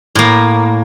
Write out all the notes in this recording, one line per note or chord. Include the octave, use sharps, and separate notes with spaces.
A2 A#3